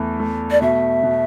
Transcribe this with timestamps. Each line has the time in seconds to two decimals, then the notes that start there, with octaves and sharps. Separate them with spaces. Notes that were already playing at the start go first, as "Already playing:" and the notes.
Already playing: E2 E3 A3
0.20 A3
0.51 D5
0.62 B2 E5
1.03 B2